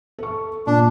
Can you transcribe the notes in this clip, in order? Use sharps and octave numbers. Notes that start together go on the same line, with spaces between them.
A4 C#6
A#2 D4